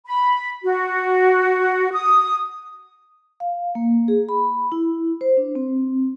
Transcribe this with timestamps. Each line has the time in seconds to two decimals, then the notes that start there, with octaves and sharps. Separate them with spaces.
0.07 B5
0.65 F#4
1.93 D#6
3.40 F5
3.75 A#3
4.08 G#4
4.29 B5
4.72 E4
5.21 C5
5.37 D4
5.55 C4